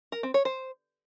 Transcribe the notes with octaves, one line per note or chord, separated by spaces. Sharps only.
A#4
C4
C#5
C5